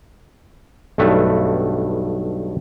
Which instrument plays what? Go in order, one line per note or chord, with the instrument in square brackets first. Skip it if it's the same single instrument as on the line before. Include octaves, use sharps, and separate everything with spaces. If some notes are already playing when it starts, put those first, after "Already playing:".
[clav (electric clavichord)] B1 G2 A3 B4 E5